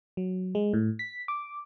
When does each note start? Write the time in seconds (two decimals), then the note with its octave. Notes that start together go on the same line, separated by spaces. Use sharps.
0.17 F#3
0.55 G#3
0.74 A2
0.99 B6
1.28 D6